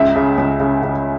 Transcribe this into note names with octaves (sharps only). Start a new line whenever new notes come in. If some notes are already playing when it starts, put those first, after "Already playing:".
Already playing: C#2 E5
C#3
C#2
C#3
C#3